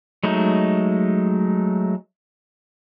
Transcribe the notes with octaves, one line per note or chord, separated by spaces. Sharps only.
F#3 G#3 A3 D#4